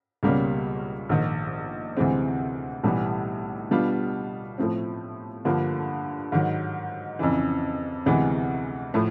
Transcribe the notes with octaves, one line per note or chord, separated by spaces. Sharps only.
C#2 B2 G3 A#3 C#4
A#1 G#2 D#3
D2 C3 E3 G#3 C4
B1 A2 E3 G3 B3
B2 G3 B3 D4 F4
A2 F3 A3 C4
G2 D3 F3 A#3
G#2 D#3 F#3
F2 C#3 E3
D2 C3 E3 G#3 B3
A2 F3 A3